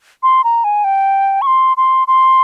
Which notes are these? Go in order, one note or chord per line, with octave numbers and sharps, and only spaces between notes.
C6
A#5
G#5
G5
C#6
C6
C6
C6